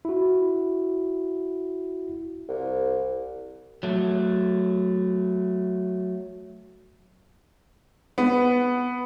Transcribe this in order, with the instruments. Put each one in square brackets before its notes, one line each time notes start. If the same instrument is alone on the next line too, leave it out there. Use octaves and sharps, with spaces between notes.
[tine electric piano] E4 F#4
[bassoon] C2
[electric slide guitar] F#3 A3
[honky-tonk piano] B3